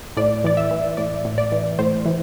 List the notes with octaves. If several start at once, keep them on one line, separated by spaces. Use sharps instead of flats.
A2 D5
E3 D5
E5
E3
A2 D5
A2
D5
E3
A2 C5
E3